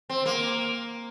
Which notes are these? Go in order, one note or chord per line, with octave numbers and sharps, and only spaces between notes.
C4
A#3